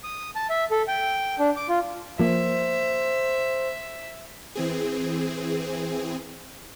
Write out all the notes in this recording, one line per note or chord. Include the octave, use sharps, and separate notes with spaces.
D#6
A5
E5
A4
G5
D4
D6
F4
F3 A#3 C5 E5
E3 C4 G#4